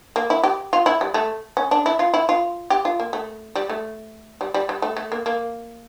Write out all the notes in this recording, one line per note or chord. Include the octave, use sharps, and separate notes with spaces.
A#3
E4
G4
F4
E4
G3
A3
C#4
D4
E4
F4
E4
F4
G4
F4
A#3
A3
G3
A3
G3
G3
G3
A3
A3
A#3
A#3